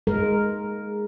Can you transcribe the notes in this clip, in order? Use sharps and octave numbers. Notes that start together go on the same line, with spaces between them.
G#3 A#4